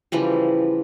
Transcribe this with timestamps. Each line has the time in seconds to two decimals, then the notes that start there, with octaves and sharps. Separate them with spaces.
0.12 C#3 E3 F3 G3